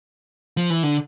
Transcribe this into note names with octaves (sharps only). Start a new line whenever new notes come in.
F3
E3
D3